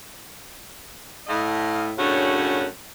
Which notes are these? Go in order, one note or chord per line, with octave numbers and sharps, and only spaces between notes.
A2 D#5 F5
F#2 A2 C#3 C#4 D4 F#4